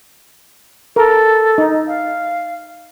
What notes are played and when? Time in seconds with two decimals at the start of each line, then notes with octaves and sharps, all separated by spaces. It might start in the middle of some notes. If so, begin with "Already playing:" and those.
0.96 A4 A#4
1.58 D#4
1.87 F5